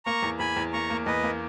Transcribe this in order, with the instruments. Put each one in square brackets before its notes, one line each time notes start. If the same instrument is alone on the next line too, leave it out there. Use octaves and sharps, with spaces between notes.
[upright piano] A#3 [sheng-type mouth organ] A#5 C#6
[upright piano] E2
[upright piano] E2 [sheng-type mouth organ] G#5 B5
[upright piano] E2
[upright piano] A#3 [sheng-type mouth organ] A#5 C#6
[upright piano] A#3
[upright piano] E2 [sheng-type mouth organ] B4 D#5
[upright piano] A#3